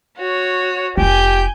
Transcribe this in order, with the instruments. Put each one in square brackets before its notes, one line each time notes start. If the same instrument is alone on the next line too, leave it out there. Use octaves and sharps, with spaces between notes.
[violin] F#4 C#5
[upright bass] F1 F4 [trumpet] G4 [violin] G#5 G6